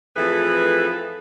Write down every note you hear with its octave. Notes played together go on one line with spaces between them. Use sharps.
F2 A2 E3 G#4 A4 B4